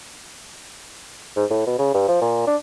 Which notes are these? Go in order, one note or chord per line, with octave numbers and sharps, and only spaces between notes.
G#2
A2
B2
C#3
G2
F3
A#2
D4